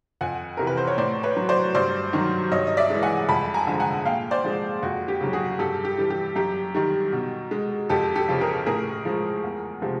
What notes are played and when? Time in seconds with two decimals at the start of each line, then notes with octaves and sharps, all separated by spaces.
0.21 F2 F#5 G#5
0.57 C3 E3 A#4
0.67 B4
0.77 C5
0.87 C#5
0.98 A2 C5 D5
1.23 B4 C#5
1.36 F#3
1.49 C5 D5
1.75 G2 C5 D5
2.13 D#3 F#3
2.52 G2 C#5 D#5
2.67 D#5
2.77 D5 E5
2.90 E3 G#3
3.03 F#5 G#5
3.28 F2 A5 B5
3.54 G#5 A#5
3.67 D3 F3 G#3
3.80 F#5 G#5
4.05 A#2 F5 G5
4.31 C5 D5
4.44 F3 G#3
4.83 F2 F#4
5.08 G4
5.21 C#3 F#3
5.33 F#4 G#4
5.59 G2 G4 A4
5.85 G4
5.98 E3 G3
6.10 G4
6.36 F#2 G4
6.75 D#3 G3
7.13 B2
7.51 G#3
7.89 F2 G4 A4
8.15 G4 A4
8.29 C#3 F3
8.41 G#4 A#4
8.66 A2 G#4 A#4
9.05 F3 G#3
9.44 E2
9.82 C3 F3 G#3